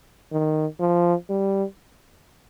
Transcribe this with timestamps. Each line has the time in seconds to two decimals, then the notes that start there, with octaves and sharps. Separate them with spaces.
0.32 D#3
0.80 F3
1.29 G3